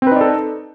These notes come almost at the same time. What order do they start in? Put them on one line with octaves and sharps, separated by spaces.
C4 B4 D#4 D5 A4